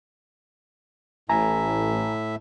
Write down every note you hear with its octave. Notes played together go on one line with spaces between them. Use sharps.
A1 A2 E5 G#5 A#5